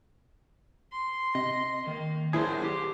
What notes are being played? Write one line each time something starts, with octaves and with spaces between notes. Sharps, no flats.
C6
C3 D#5
D#3 A#3
A#1 F#3 D4 E4 G#4 A#4 C5
G4